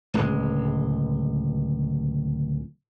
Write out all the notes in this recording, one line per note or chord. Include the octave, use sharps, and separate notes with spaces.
D1 C#2 G#3